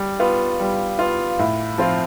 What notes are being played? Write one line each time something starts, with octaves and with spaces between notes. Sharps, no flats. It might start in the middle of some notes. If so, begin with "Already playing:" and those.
Already playing: G3
B3 F4
G3
B3 F4
A2
F3 C4 F4